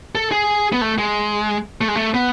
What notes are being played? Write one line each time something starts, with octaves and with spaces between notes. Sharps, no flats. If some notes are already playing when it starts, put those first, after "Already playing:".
A4
G#4
B3
A3
G#3
A3
G#3
A3
B3